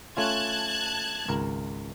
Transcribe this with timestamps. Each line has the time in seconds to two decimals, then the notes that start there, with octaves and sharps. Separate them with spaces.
0.17 A3 C#4 F4 A5 F#6 G#6
1.28 G#1 C#2 A#4